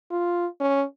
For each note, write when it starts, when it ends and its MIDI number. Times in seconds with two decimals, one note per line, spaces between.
0.11 0.47 65
0.60 0.84 61